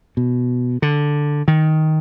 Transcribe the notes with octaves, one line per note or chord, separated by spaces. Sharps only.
B2
D3
D#3